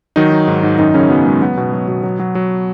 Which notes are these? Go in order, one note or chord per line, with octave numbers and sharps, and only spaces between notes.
D#3 F#3 D#4
F#3
G#2
G#2
F#2 D#3 D#4
F#2 C#3 C#4
F#3 B3
F#3 G#3
F#3 B3
B2
F#3
B2
F#3
F#3
F#3